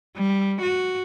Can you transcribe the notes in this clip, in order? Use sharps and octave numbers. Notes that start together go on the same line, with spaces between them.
G3
F#4